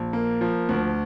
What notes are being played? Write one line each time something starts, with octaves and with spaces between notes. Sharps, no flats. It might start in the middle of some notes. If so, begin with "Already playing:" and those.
Already playing: A#1
A#3
F3
D2